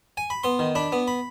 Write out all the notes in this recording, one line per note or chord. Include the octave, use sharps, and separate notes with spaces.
G#5
B5
B3 C6
D#3
D4 B5
B3
B5